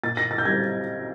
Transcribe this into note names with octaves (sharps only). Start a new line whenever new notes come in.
A#2 A6
A#6
A6
G6
G3 C4 G#6